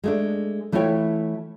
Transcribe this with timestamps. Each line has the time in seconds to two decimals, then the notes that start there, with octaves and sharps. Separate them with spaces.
0.04 G#3 A3 D4
0.72 E3 A3 E4 F4 C#5 G5